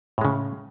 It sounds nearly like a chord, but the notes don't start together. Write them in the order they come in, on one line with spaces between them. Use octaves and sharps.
A2 G#3 C#3